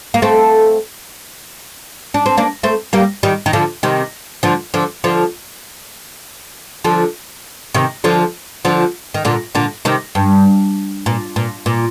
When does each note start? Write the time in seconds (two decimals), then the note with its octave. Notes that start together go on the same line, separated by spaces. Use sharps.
0.14 A#3
0.22 A3 C4
2.14 D4
2.26 C4
2.37 A#3 D4
2.63 A3 C4
2.93 G3 A#3
3.23 D#3 G3
3.46 D#3
3.53 D3 F3
3.83 C3 D#3
4.43 D3 F3
4.74 D3 F3
5.04 D3 F3
6.84 D3 F3
7.74 C3 D#3
8.04 D3 F3
8.65 D3 F3
9.14 D#3
9.25 A#2 D3
9.55 A#2 D3
9.85 C3 D#3
10.15 G2
11.06 A#2
11.36 A#2
11.66 A#2